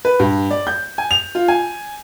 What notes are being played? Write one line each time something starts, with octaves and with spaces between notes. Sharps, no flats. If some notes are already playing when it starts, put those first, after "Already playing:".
B4
G2
D5
G6
G#5
F7
F4
G#5